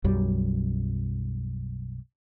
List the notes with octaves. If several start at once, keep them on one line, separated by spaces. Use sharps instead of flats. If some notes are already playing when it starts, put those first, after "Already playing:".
B1 F#2 F#3 G3